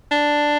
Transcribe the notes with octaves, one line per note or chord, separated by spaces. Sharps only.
D4